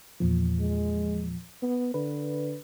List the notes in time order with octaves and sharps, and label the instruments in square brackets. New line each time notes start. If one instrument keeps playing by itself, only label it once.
[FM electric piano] E2 A#2 F3
[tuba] G#3
B3
[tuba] D3 [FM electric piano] B4